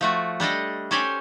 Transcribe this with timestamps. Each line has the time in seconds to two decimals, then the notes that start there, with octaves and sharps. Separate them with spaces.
0.01 F3 A3 F#4
0.40 G3 D4 A4 D#5
0.91 C#4 G4 A4 C5 D5 G#5